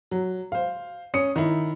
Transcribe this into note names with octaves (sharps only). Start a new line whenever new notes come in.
F#3
C5 F5
C#4 D#6 C#7
D#3 E4